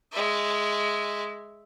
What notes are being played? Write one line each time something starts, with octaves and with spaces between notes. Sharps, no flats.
G#3 E5